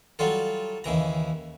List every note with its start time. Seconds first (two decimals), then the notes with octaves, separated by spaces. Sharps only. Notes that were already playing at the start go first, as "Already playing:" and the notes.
0.19 F#3 G3 F4 A4
0.84 D#2 C#3 E3 A#5